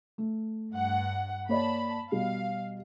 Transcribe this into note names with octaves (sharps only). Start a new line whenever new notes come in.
A3
G2 F#5
A#3 C#5 D5 A5 B5
B2 G3 F5